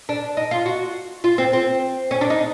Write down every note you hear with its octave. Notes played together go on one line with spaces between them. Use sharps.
D4
D#4
F4
F#4
F4
C4
C4
C#4
D4
D#4